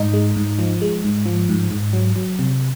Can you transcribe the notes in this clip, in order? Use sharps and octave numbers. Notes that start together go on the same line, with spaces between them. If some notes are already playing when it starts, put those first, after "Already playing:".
Already playing: G#2 D#4
G#3
G#2
F3
G#3
G#2
F3
G#2
G#2
F#3
F#3
C3